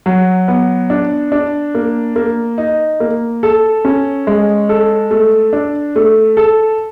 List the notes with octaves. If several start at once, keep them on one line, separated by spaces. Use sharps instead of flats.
F#3
B3
D4
D4
A#3
A#3
D#4
A#3
A4
C#4
G#3
A4
A3
D4
A3
A4